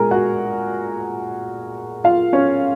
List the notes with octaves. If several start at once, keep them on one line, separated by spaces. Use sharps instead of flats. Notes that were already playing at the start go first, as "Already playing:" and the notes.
Already playing: A#2 G#3 G#4 A#4 G#5 A#5
F#4 F#5
F4 F5
C#4 C#5